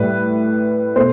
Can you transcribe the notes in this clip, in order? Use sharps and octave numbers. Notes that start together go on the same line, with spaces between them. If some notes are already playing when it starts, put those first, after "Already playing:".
Already playing: A2 G3 B4
B2 A3 C5